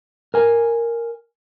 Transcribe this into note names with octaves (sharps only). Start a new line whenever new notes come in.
A#4 G#5